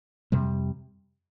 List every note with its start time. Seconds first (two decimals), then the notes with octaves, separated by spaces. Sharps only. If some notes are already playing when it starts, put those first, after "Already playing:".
0.32 F2 C3 G3